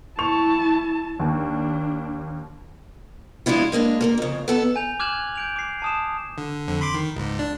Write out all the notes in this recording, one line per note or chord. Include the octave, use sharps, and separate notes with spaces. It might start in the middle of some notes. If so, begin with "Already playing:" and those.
E4 A5 C#6 F7
D#2 D4
F3 G#3 D4 E4 F4
G#3 A#3 C#4 D4
A#3 A4 A#4
F2 C#3
B3 A4 A5
G#5 G6 F7
D6 F6 F#6 G#6 E7 F#7
G6 D7 F7
D6 C7
A5 D#6 E7
D3
F2 D3
B5 C6 D6
D#3
C#2 G#2
D4